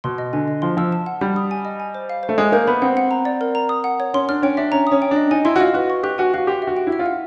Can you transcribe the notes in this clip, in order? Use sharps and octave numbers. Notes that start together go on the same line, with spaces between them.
B2 C6
D#5
D3 G#5
D#5
F3 C6
F3 E6
A5
F#5
G3 B5
D#6
G#5
D#5
G#5
C5
F5
C5
A3
G#3 D#6
A#3 G6
B3 B5
C4 F#5
F#5
A#5
D5
A#4
A#5
D#6
F#5
C#5
C#4 C6
D4 F6
C#4 G5
D4 E5
C#4 A#5
C#4 D#6
G5
D4
D#5
D#4 G#5
E4 C6
F#4
F4 D#5
F#4 B4
C#6
G4 F#6
F#4 G#5
F#4 F5
G4 C6
E5
F#4
G5
E4
E5
F4
F#5